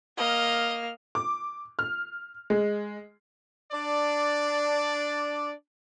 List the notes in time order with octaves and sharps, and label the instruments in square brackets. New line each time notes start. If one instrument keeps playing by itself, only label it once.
[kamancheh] A#3 F6 [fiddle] D#5
[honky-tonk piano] D6
F6
G#3
[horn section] D4 D5